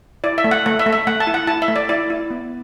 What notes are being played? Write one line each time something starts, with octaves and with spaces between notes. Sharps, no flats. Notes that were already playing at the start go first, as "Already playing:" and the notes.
E4 D5
E5
A3
F#5
A3 F#5
E5
A3
E5
A3 F#5
A5
E4
F#5
E4 A5
E5
A3
D5
E4 D5
E4
B3